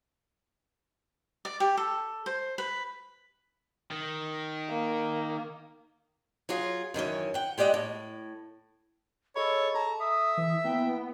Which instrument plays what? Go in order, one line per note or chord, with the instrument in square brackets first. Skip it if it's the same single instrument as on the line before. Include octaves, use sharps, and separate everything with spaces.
[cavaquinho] D5
G4
A4
C5
B4
[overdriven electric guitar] D#3
[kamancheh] A#3
[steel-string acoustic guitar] F#3 F4 G#4
F#2 D#3 E3 C#4
F#5 G5
G#3 G4 D5 D#5 F#5
A2
[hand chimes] G#4 D#5 B5 [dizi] A4 [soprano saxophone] C#5
[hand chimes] A4 [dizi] A5 [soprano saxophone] A#5
[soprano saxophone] E5 [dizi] D#6
[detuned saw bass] E3
[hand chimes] A#3 E4 [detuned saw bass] B3 [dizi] G5